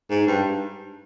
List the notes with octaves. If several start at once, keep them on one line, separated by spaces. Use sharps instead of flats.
G#2
G2